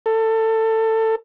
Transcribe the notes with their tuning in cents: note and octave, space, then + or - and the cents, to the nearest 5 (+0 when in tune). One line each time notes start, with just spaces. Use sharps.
A4 +20